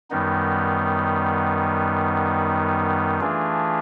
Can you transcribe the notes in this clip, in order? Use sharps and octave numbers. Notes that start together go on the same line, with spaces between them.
F#2 D#3 G3 B3 D#4
E3 A3 D4 F4 G#4